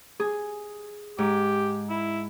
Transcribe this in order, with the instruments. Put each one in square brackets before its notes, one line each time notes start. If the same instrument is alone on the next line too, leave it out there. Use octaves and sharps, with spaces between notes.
[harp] G#4
[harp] G#2 [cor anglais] G4
[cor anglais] E4